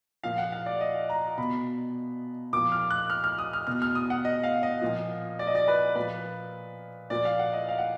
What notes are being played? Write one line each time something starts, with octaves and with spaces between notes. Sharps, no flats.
A#2 F3 F5
F#5
F5
D5
D#5
A#5
B2 B5
A#2 F3 D6
F6
F#6
F6
F6
D#6
F6
B2 F6
F6
D#6
F#5
D#5
F5
D#5
A#2 F3
D5
D#5
D5
B4
A#2 F3 B4
A#2 F3 D5
F5
F#5
D#5
F5
F#5